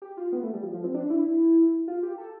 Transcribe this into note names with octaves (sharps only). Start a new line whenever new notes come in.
G4
F4
B3
A3
G3
F3
F3
C4
D4
E4
F4
G4
A4